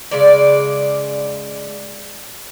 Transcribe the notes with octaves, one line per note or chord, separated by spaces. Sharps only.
C#3 G#3 D5